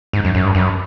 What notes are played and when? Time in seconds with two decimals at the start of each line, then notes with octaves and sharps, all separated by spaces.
0.13 G#2
0.25 F#2
0.35 F#2
0.45 G2
0.55 F#2